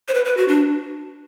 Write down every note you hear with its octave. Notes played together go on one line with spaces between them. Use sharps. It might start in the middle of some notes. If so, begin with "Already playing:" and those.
C5
B4
B4
F#4
D4